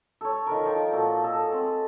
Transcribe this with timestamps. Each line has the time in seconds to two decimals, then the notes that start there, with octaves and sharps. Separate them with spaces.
0.21 A4 C#5
0.47 D#3 F3 A#4
0.65 F3 G5
0.92 A#2 F#4 A4
1.23 G#4 A4 D#5
1.52 C4